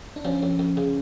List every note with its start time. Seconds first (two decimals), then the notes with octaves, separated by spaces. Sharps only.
0.16 D4
0.25 F3 C#4
0.43 F2
0.59 F2
0.77 C#3